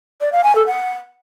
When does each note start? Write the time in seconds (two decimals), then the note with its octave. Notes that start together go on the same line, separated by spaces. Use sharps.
0.21 D5
0.32 F5
0.44 G#5
0.55 A4
0.67 F#5